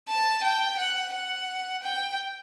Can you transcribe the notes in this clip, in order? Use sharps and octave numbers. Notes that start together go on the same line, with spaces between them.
A5
G5
F#5
F#5
G5